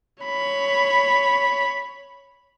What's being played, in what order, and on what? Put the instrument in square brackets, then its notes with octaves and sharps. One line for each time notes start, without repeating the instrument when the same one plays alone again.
[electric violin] C#5 B5